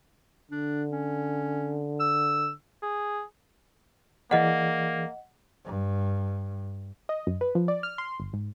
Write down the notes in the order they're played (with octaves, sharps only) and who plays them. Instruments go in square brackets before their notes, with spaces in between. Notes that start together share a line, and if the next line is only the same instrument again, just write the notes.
[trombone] D3 [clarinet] D4
[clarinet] C#4
E6
[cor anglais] G#4
[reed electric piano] E3 G#4 D5 [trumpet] A#3 [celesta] D#5 F#5
[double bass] G2
[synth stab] D#5
F#2
B4
F3
D5
F6
C6
G1
G#2